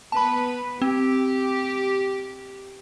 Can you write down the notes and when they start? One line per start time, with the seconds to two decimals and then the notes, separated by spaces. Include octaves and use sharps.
0.12 B3 B4 A5 B5
0.82 C4 G4